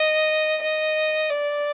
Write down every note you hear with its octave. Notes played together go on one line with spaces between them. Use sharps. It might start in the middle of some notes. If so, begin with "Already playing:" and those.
Already playing: D#5
D#5
D5